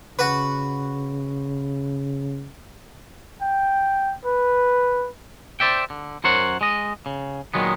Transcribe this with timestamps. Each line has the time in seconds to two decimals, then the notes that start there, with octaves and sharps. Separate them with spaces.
0.19 C#3 F#4 B4
3.41 G5
4.25 B4
5.60 C5 D5 E5 G5
5.90 D3
6.24 F#2 A#4 C5 C#5 F#5
6.61 G#3 D#5
7.06 C#3
7.54 A#2 D#3 F#3 G#3 B3